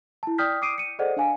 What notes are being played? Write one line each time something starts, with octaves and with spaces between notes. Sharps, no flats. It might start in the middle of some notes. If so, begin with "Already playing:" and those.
E4 A5
D5 G5 D#6 F6 G6 B6
D6 D#6 C7 D7 D#7
C#7 D#7
G#4 A4 C5 D5 D#5 F#5
D4 F5 G#5